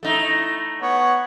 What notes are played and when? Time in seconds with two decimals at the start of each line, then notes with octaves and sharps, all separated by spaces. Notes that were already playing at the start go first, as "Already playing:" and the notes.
0.03 A3 D#4 E4
0.82 B3 C#5 F#5